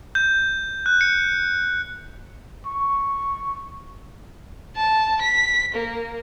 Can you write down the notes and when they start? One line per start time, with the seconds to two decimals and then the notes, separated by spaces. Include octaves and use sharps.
0.15 G6
0.86 F#6
1.01 C#7
2.66 C#6
4.76 A5
5.21 B6
5.74 A#3